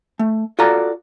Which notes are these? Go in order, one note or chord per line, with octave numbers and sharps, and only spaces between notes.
A3
F4 F#4 A4 D5 A#5